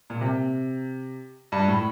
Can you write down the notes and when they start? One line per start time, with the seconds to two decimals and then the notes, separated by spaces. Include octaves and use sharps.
0.10 A#2
0.21 C3
1.52 G2
1.68 A2